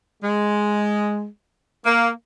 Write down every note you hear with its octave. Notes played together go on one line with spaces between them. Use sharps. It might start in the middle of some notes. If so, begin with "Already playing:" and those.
G#3
A#3